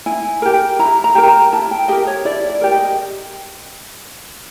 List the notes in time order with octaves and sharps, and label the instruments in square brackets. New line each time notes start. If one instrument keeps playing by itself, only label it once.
[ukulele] E4 G#5
G4 A#4
E4 A#5
A#5
G4 A#4
A#5
E4 A5
G5
G4 A#4 D#5
C#5
E4 D5
D5
G4 A#4
D#5